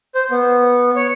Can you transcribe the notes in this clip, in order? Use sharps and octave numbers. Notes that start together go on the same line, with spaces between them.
C5
B3
C#5